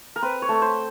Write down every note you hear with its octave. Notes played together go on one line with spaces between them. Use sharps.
A#4
C4 B4
C#5
A3
C5